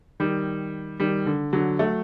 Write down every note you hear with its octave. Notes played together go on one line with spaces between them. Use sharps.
D#3 G3
D#3 G3
D3
D3 F#3
F#3 A3